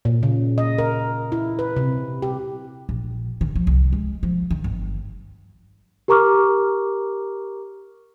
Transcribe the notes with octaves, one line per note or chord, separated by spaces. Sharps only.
A#2
C#3
D#5
A#4
E4
B4
C3
G4
A#1
D#3
F3
C2
G#3
F3
D#3
G1
G4 A#4 A#5 C#6 D6 F6